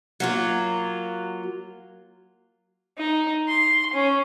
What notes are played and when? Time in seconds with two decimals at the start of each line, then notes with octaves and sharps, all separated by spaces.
0.20 F#3 A#3 F4
2.98 D#4
3.48 C6
3.93 C#4